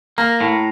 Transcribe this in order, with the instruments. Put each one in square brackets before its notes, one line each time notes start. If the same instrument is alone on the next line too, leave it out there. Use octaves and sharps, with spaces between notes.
[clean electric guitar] A#3 [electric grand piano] A#5
[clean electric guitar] A2